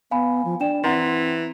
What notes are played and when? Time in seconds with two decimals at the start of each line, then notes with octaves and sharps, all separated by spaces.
0.11 B3 F5 G#5 B5
0.45 F3
0.60 D4 D5 G5 E7
0.84 E3 C4 F#5 A#5 C6